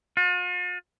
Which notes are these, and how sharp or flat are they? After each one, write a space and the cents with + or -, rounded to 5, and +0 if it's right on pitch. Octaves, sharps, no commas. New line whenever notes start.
F4 +45